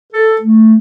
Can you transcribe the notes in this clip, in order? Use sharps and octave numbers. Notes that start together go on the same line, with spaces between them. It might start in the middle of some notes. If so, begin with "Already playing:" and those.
A4
A3